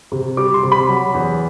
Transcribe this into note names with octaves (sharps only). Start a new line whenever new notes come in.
C3
G3 D6
C6
C3
B5
F#3
E2